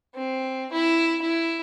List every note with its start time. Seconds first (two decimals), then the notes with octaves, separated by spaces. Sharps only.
0.14 C4
0.72 E4
1.22 E4